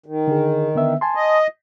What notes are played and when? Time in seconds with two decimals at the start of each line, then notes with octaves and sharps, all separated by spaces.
0.06 D#3
0.27 D3 G#4
0.75 D3 B3 E5
1.01 G#5 A5 C6
1.15 D#5